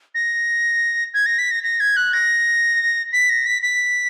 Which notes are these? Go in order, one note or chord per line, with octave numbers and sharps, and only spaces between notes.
A#6
G#6
A#6
B6
A#6
A#6
G#6
F#6
A#6
B6
A#6
B6
B6